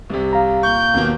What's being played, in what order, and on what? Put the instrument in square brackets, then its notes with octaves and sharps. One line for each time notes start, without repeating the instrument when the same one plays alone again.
[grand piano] C2 C3
[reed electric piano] F5 A#5
[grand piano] A#2 C#6 [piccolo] G6
[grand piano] D#2 B2 A#3